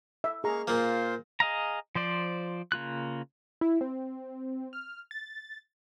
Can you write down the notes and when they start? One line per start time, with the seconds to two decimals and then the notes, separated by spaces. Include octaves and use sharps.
0.24 E5
0.44 A#3 G#4 F5 A#5 C#6
0.68 A#2 A#3 F4 C5
1.40 G#4 D#5 F5 A#5
1.95 F3 C5 D5
2.72 C#3 A#3 F4 F#6
3.61 E4
3.81 C4
4.73 F6
5.11 A6